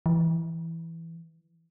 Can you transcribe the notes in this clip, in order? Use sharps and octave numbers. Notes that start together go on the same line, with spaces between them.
E3